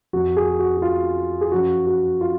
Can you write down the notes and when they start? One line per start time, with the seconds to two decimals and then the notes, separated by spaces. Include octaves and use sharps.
0.13 F2 F3 F#4
0.37 G#4
0.59 F#4
0.77 F#4
0.82 F4
1.41 G#4
1.52 F#2 F3 F#4
1.86 F#4
2.21 F4